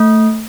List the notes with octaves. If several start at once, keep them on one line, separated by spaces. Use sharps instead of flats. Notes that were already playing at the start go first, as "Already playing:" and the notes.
Already playing: A3